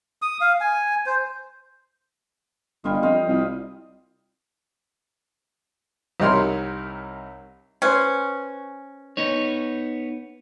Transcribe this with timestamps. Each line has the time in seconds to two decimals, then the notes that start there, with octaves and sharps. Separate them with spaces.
0.22 D#6
0.41 F5
0.61 G#5
1.06 C5
2.84 G1 G3 F4 D#5
3.03 F2 C5 D#5 F5
3.28 C2
6.20 C2 C3 D#4 A#4 C#5 C6
7.82 C#4 B4 C5
9.17 B3 D#4 C#5